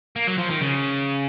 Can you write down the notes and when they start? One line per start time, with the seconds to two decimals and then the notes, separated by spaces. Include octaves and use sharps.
0.16 A#3
0.27 F#3
0.38 F3
0.50 D#3
0.61 C#3